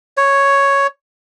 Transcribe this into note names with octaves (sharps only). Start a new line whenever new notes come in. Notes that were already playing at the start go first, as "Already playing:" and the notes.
C#5